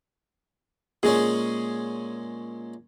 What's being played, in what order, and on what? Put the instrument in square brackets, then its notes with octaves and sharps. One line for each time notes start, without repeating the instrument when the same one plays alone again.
[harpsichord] A#2 G#3 C#4 [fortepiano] G#4